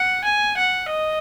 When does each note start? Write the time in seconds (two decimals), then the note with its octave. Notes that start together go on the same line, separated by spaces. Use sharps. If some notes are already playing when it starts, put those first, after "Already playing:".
Already playing: F#5
0.25 G#5
0.58 F#5
0.90 D#5